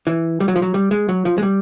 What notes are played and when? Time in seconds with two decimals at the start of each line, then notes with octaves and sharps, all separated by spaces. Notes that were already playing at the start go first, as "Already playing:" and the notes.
0.07 E3
0.40 G3
0.48 F#3
0.56 F3
0.62 F#3
0.74 G3
0.91 G#3
1.09 F#3
1.25 F3
1.38 G#3
1.43 G3